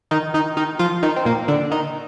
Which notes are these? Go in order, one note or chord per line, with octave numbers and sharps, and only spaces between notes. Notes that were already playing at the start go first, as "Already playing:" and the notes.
D#3 D#4
D#3 D#4
D#3 D#4
F3 F4
D#3 D#4
C4
A#2 A#3
D3 D4
D#3 D#4